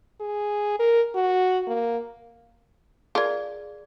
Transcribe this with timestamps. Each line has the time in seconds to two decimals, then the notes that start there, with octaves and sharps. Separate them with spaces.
0.20 G#4
0.79 A#4
1.14 F#4
1.67 A#3
3.15 F4 G#4 A#4 D5